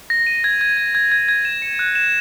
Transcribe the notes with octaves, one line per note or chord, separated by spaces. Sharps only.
A#6
D#7
G#6
G#6
G#6
G#6
G#6
G#6
E7
C#7
F#6
E7